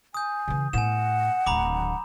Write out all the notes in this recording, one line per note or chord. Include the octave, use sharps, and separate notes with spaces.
G#5 D#6 G6
C#3 E3
A2 B3 F#5 G#5 E7
D1 D#3 A#5 B5 D6